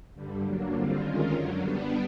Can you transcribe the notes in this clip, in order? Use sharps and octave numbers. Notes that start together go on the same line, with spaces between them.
G2 D3 G3
F#3 A#3 D4
D3 G3 C4 F4
D#3 G#3 C#4 F4 A#4
F#2 D3 F#3
G3 B3 D4